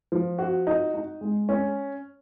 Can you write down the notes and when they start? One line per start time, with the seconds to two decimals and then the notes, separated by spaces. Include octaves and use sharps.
0.12 F3
0.38 F#4
0.67 D#4
0.94 D#4
1.21 G#3
1.49 C#4